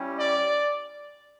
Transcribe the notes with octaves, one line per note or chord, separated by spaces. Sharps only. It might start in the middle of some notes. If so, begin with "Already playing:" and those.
Already playing: G3 C#4 E4 G4
D5